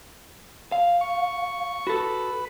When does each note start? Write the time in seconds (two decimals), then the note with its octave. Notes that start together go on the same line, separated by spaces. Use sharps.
0.72 F5
1.01 C#6
1.87 F#4 A4 B4